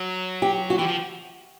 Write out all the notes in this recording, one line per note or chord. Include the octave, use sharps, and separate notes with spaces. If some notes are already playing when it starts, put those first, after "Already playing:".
Already playing: F#3
G4
F#4
E3 G4
F3